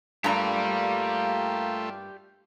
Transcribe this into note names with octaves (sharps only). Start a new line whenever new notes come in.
G2 A3 A#3 F4 G4 D5 A#5